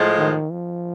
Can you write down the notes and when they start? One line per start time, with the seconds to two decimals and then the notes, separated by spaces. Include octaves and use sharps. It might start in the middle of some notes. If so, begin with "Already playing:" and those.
Already playing: A2 F3 G#3
0.18 D#3
0.52 F3